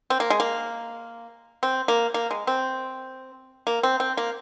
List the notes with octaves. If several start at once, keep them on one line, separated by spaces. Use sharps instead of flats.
C4
A#3
G#3
A#3
C4
A#3
A#3
G#3
C4
A#3
C4
C4
A#3